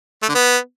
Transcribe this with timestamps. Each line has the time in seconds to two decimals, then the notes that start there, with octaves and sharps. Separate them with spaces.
0.23 A3
0.29 D3
0.35 B3